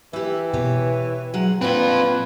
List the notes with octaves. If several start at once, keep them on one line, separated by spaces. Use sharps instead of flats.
E3 E4 G4
B2 G4 B4 C#5
F#3 G#3 F#5
A#2 C4 D4 F4 B4